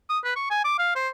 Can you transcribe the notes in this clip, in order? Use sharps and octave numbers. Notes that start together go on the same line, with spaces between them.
D#6
B4
C#6
G#5
D6
F5
C5